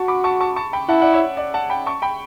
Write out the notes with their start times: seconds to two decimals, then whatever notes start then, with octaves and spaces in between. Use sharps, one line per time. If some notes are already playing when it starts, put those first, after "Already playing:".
Already playing: F#4 A5 C#6
0.08 B5 D6
0.24 A5 C#6
0.40 A5 C#6
0.56 A5 C#6
0.73 G5 B5
0.89 E4 F#5 A5
1.02 D5 F#5
1.13 C#5 E5
1.37 D5
1.54 F#5 A5
1.70 G5 B5
1.86 A5 C#6
2.02 G5 B5